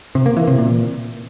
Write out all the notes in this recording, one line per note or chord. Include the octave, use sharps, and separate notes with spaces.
C3
A#3
E3
C3
A#2